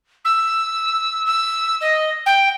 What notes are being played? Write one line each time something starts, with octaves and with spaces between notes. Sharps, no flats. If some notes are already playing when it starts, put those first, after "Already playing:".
E6
E6
D#5
G5